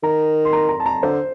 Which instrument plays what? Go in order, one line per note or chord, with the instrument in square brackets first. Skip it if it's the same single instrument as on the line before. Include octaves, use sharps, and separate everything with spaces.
[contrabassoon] D#3 [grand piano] A#5
[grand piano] C6
A#5
A#5
A5
A#5
[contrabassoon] D3 [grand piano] C5